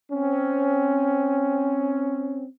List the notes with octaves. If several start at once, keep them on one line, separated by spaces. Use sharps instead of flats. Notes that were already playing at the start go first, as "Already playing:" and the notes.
C4 C#4